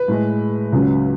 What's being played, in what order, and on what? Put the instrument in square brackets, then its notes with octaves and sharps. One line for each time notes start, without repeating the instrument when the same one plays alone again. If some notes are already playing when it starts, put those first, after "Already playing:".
Already playing: [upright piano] B4
A2 G#3
C#2 C#3 F#3